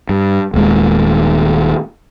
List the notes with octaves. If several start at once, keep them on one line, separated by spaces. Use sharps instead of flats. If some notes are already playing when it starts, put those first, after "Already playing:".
G2
D#1 D#2 G#3